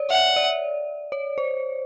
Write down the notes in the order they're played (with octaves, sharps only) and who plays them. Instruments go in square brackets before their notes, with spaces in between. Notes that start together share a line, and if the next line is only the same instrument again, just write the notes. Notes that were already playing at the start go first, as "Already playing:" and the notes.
Already playing: [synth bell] C#5 D5
[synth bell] E5 [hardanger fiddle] F#5
[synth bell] D5
C#5
C5